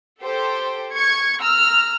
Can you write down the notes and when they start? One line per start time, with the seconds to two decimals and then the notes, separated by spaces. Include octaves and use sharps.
0.20 G4 A4 C5 G5
0.95 C#6 G#6 C#7
1.42 A#5 E6 F6